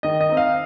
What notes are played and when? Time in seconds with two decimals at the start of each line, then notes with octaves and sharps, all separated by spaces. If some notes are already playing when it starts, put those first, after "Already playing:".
0.03 D#3 D#5
0.21 D#5
0.29 C4 D#4
0.37 F5